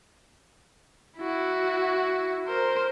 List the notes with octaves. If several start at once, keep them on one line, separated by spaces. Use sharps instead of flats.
E4 F#4
A#4 C5